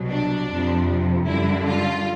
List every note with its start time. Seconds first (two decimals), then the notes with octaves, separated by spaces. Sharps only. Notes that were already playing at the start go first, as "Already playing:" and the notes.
Already playing: C2 B2 F#3
0.10 D4
0.49 F2 C3 F3
1.27 F#2 D3 G3 E4
1.66 F4